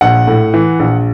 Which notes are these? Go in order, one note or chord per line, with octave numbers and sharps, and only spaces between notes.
A#1 F#5
A2
E3
A#1